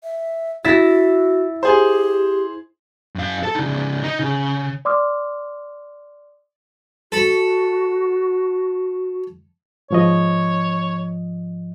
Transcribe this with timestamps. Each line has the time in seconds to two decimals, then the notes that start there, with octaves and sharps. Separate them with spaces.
0.03 E5
0.65 E4 F#4 E5 A6 A#6
1.63 G4 G#4 C5
3.15 F#2 F5
3.43 A4 A5
3.55 C#3 D#4
4.03 D#4
4.20 C#3
4.85 D5 C6 D6 D#6 F6
7.12 F#4 A4 B5
9.91 G#2 F3 C#5 D#5